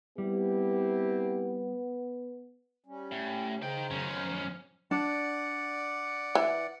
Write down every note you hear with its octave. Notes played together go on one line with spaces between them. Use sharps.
G3 B3 C4 E4 G4
G3 C#4
A2
C#3 D#4 C5 G5 A#5
F#2 D#3 C#4
F3
D4 D5 F#5
E3